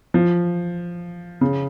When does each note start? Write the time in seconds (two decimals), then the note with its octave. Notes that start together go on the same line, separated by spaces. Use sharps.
0.14 F3
1.41 C#3